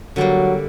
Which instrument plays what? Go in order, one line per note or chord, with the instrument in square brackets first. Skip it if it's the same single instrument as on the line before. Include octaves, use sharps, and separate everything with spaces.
[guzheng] D3 G3 A#3 [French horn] F#3